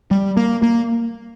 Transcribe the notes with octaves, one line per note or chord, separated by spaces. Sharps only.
G3
A#3
A#3